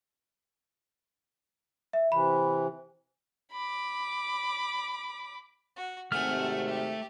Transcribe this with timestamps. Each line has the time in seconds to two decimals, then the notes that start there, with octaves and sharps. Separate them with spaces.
1.93 E5
2.12 C3 E3 B5
3.52 B5 D6
5.76 F#4
6.12 G#1 C3 A3 F#5 G#5 F6
6.67 G4